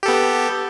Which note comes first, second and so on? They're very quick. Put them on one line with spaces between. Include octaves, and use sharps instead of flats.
G4 A4 B3